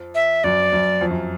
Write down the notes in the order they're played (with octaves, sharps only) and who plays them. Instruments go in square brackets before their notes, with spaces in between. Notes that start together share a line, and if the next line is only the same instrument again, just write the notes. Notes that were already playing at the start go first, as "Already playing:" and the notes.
Already playing: [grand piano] F2
[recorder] E5
[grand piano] F#2 [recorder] D5
[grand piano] F#2
F2
F#2